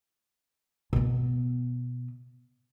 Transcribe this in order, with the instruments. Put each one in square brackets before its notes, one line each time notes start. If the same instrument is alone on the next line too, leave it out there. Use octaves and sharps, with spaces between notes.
[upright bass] B2 B3